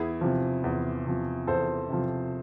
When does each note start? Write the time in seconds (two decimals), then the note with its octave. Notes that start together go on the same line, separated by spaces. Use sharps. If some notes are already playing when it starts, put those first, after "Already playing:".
Already playing: E2 E4 G#4
0.21 C3 F3
0.64 E2
1.06 C3 F3
1.47 E2 A4 C5
1.89 C3 F3